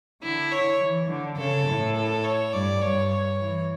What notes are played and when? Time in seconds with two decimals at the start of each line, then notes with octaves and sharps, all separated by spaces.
0.23 D3 E4
0.52 C#5
0.81 E3
1.10 D3
1.38 C#3 A4
1.67 A2
1.96 A4
2.24 C#5
2.53 G2 D5
2.82 G2 C#5
3.10 C#5
3.39 E3